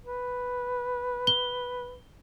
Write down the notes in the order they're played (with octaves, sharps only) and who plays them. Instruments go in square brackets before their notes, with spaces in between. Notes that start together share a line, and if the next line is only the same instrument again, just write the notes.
[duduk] B4
[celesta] G7